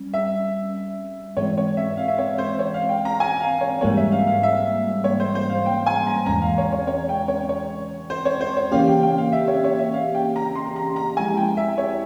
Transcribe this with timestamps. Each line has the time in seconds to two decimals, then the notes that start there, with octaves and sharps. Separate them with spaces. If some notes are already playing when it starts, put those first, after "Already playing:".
Already playing: G3 C#4
0.14 E5
1.37 G#2 E3 G#3 C4 C#5
1.58 C#5
1.77 E5
1.97 F5
2.08 E5
2.18 C#5
2.38 C5
2.59 C#5
2.74 F5
2.89 G5
3.05 A#5
3.20 G#5
3.41 F5
3.61 C#5
3.81 G#2 E3 G3 A#3 C#5
3.97 E5
4.12 F5
4.27 F5
4.43 E5
5.04 C#5
5.20 C5
5.35 C5
5.50 F5
5.66 G5
5.86 G#5
6.07 A#5
6.26 E2 C#3 E3 G#3 C#4 A#5
6.42 F5
6.58 C#5
6.72 C#5
6.87 C#5
7.09 G5
7.28 C#5
7.49 C#5
8.10 C5
8.25 C#5
8.41 C5
8.57 C#5
8.72 C#3 E3 A#3 C#4 G4 F5
8.87 G5
9.03 G5
9.18 F5
9.32 E5
9.48 C#5
9.64 C#5
9.79 E5
9.94 F5
10.15 G5
10.36 A#5
10.55 C6
10.76 A#5
10.96 A#5
11.17 F3 G#3 E4 G4 G#5
11.37 G5
11.57 E5
11.78 C#5